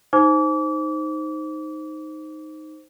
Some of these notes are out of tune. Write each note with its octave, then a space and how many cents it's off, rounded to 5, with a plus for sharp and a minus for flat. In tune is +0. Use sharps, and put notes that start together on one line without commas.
D#4 +0 C5 +0 D6 -35